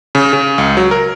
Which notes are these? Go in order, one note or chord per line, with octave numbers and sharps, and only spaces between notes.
C#3
C#3
C#2
F#3
A#4